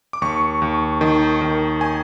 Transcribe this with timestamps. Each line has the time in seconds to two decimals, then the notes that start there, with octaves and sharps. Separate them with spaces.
0.13 D6
0.22 D#2 C#6
0.62 D#2
1.01 D#3
1.42 D#3
1.81 G#5